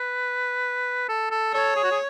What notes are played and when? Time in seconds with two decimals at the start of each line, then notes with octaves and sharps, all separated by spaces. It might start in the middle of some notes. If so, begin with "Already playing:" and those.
Already playing: B4
1.09 A4
1.31 A4
1.54 A4 C#5
1.76 G#4
1.84 F#4
1.91 G#4